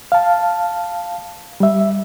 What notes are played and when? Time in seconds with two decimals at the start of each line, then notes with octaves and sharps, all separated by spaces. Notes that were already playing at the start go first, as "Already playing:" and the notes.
0.12 F5 A5
1.60 G3 E5